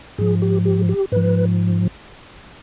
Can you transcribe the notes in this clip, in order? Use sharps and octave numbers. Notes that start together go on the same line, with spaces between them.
G#2 F3 G#4
G4
G4
G4
G#2 F3 B4